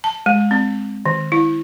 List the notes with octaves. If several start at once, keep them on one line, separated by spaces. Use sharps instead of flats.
A5
G#3
C4
D#3
E4